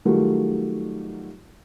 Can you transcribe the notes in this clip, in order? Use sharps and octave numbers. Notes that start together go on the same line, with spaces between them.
D#3 F#3 G3 A3 F4 A#4